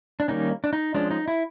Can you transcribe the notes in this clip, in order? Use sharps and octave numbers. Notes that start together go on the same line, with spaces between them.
D4
D#3 G3 A#3 C#4 D#4
D4
D#4
F3 G#3 C#4 D4
D#4
E4